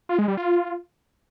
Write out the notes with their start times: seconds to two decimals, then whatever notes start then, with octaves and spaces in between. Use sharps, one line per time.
0.09 F4
0.19 G#3
0.28 G3
0.37 F4